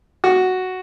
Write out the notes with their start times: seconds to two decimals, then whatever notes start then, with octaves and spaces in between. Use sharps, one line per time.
0.24 F#4